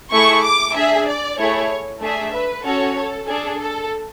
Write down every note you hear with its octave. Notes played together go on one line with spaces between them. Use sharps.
A3 E4 G#4 C#6
D6
D4 G#4 E5
D5
A3 E4 G#4 C#5
A3 D4 G#4 E5
B4
C#4 F#4 A4 C#5
A4
D4 G#4 A4
A4